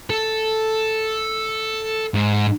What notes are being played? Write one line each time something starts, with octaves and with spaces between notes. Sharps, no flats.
A4
G#2